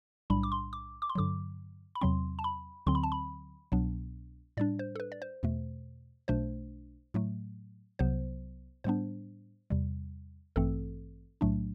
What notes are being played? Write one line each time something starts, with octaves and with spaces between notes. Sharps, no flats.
B1 A2 G3 D4 B5
D6
C6
D6
D6
C6
G2 D3 F#3 D6
B5
E2 C3 F#3 C4 C6
A5
B5
D2 D3 F#3 C4 C6
B5
A5
B5
C2 B2 F#3 B3 D4
A2 G3 D4 D5
C5
A4
B4
D5
C5
E2 B2 A3
B1 B2 A3 D4 C5
A2 F#3 A3
C2 C3 F#3 B3 C5
A2 G3 B3 D4 C5
E2 C3 G3
A1 G2 E3 A3 C4 A4
B1 A2 F#3 A3 D4